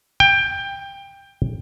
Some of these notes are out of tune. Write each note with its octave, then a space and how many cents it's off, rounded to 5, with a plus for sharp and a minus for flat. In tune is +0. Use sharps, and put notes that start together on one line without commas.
G5 +15